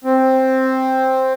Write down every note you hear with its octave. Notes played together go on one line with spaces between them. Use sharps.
C4